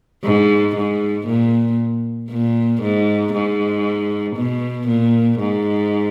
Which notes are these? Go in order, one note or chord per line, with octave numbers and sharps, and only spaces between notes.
G#2
G#2
A#2
A#2
G#2
G#2
B2
A#2
G#2